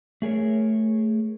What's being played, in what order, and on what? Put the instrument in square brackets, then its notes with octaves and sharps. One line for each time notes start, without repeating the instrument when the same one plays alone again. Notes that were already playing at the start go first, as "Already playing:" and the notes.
[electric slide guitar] A3 G#4 A#4 C#5